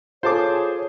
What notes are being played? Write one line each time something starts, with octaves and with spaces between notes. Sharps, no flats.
F4 G#4 A4 C5 C#5 A5 D6